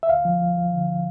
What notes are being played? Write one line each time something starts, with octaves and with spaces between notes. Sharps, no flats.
E5
D2 F5
F3
F3
F3
D3